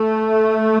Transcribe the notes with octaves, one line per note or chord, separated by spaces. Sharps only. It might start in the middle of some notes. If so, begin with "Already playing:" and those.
Already playing: A3